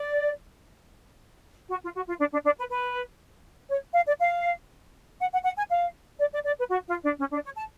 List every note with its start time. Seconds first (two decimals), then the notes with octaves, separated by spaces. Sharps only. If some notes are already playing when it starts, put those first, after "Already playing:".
Already playing: D5
1.70 F#4
1.83 F4
1.96 F#4
2.08 F4
2.20 D4
2.33 D4
2.45 D4
2.58 B4
2.70 B4
3.71 C#5
3.95 F5
4.08 D5
4.20 F5
5.20 F#5
5.33 F#5
5.45 F#5
5.58 G#5
5.71 F5
6.19 D5
6.33 D5
6.45 D5
6.58 B4
6.70 F#4
6.87 F4
7.04 D4
7.19 C#4
7.33 D4
7.44 C#5
7.57 A5